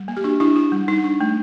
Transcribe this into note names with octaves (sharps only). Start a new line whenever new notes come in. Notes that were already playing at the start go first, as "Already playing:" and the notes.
Already playing: G3
A#3
G4
D4 F#4
D4 E4
D4 E4
G3
G3 D#4
D4
A3